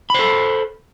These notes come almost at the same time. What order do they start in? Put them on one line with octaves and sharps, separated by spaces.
B5 C5 A4